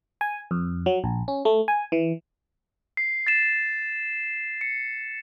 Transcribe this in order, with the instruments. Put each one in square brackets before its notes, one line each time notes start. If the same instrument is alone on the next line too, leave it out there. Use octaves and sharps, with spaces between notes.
[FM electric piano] G#5
F2
F#3
A#1
C#4
A3
G#5
E3
[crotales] C7
A6 C7 E7
C#7